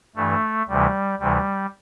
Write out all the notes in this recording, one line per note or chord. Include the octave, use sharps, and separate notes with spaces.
G2 E3 A3
D2 C3 E3 G3
D2 C3 E3 G3